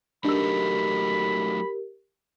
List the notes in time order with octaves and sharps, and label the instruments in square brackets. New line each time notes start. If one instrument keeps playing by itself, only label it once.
[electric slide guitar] F#3 A3 D#4 [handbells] D4 E6 [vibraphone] G4 A#4 [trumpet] B5